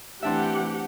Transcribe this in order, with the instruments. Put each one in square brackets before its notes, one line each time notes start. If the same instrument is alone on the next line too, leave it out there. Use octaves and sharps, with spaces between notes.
[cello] E3 A3 [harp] C4 D4 E5 [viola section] G4 F#5